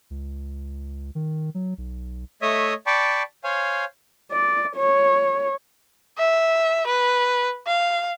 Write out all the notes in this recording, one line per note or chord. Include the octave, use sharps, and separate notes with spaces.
C#2
D#3
F#3
B1
A3 C#5 D#5 E5 D#6
D5 G5 A5 B5 C#6
C5 C#5 F5 G#5
D5
C#5
E5
B4
F5